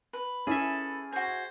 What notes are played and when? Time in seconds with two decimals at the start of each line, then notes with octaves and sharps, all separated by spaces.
0.13 B4
0.47 C#4 E4 G#4 A4 E5
1.12 F#4 C5 G#5